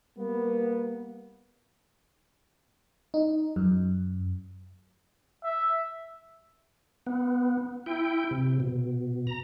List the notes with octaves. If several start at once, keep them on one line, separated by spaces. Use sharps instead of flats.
G3 A#3 B3
D#4
F#2
E5
B3
E4 G5
C3
B2
A#5